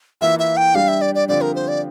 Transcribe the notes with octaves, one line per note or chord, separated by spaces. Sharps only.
E3 A#3 F4 E5
E5
G5
G3 D4 G4 F5
E5
D5
D5
D3 F3 C4 G4 D5
A#4
C5
D5